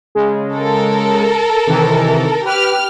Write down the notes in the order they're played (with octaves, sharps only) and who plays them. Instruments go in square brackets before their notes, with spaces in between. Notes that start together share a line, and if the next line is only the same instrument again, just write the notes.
[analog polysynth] C#3 G#3
[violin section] A4 A#4
[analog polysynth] C3 D#3 E3
[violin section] G4 F6 [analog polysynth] B4